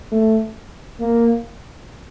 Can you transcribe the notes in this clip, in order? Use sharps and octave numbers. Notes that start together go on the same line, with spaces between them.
A3
A#3